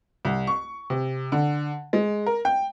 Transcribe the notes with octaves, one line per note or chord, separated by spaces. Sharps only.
C2
C#6
C3
D3
G#3
A#4
G5